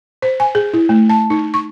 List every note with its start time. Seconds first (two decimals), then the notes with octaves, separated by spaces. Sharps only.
0.22 C5
0.40 G#5
0.55 G#4
0.74 E4
0.89 A3
1.10 A5
1.30 D#4
1.54 C#6